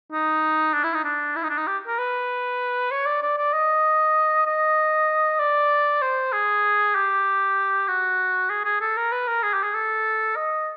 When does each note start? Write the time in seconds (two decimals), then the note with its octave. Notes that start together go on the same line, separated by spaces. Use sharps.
0.12 D#4
0.74 D4
0.84 E4
0.94 D#4
1.04 D4
1.36 E4
1.43 D#4
1.50 D4
1.57 D#4
1.67 G4
1.87 A#4
1.98 B4
2.91 C#5
3.06 D5
3.22 D5
3.38 D5
3.53 D#5
4.47 D#5
5.39 D5
6.02 C5
6.32 G#4
6.95 G4
7.88 F#4
8.50 G#4
8.65 G#4
8.81 A4
8.97 A#4
9.12 B4
9.27 A#4
9.43 G#4
9.54 G4
9.63 G#4
9.74 A4
10.36 D#5